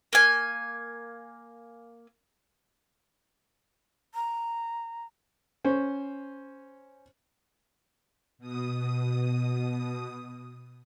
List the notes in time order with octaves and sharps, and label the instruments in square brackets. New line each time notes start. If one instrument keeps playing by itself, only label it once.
[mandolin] A#3 G#5
[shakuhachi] A#5
[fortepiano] C#4 C5
[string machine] B2 D#6